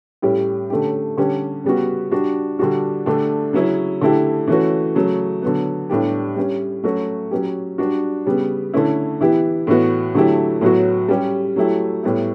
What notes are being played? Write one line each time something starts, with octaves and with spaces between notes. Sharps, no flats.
A2 G3 C#4 G4
D3 A3 C#4 G4
D3 G3 C#4 G4
C#3 G3 B3 F#4
G3 D4 F#4
D3 G3 D4 F#4
D3 A3 D4 G4
C#3 F#3 C#4 E4
D3 A3 E4 G4
E3 A3 C#4 F#4
C#3 F#3 A3
D3 F#3 B3
A2 G3 B3 D4 G4
G3 C#4 G4
F#3 A3 C#4 F#4
F#3 C#4 G4
G3 D4 F#4
C#3 G3 B3
D3 A3 C#4 E4
E3 B3 E4 G4
A2 E3 B3 F#4
D3 F#3 A3 E4 G4
A2 F#3 B3 F#4
G3 C#4 G4
F#3 A3 E4 G4
A2 G3 B3 E4